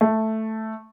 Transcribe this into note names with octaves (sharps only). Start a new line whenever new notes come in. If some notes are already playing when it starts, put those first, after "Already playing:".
A3